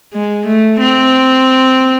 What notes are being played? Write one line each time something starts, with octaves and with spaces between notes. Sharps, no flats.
G#3
A3
C4